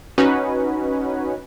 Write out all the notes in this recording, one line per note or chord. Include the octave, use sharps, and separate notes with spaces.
C#4 D#4 F#4 B4